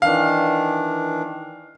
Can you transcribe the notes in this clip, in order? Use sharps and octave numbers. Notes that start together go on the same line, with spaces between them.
D#3 E3 D4 F5